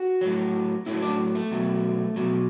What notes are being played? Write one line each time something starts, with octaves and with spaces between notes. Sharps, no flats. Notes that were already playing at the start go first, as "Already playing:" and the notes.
Already playing: F#4
A2 F#3
A2 F#3 E4
D4
A3
B2 F#3
B2 F#3